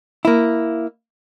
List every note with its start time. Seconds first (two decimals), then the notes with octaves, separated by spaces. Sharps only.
0.25 A#3 E4